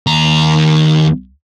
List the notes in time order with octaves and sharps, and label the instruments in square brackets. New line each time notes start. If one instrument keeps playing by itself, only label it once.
[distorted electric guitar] D#2 A#5